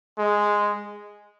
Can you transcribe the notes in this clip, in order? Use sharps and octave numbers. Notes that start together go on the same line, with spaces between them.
G#3